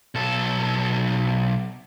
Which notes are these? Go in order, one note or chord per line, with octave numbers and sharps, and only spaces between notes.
B1 A4